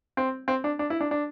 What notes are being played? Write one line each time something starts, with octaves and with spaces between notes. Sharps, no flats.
C4
C4
D4
D4
E4
D4
D4